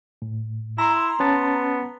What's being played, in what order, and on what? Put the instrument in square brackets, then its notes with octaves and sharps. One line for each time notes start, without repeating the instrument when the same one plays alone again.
[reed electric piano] A2
[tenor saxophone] E4 [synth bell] A#5 C6
[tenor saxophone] B3 [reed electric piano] C#4 A5 A6